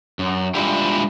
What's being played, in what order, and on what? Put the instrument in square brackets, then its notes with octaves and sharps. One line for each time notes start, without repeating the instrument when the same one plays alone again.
[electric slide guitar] F#2
G3 G#3 D4 E4 F4 G4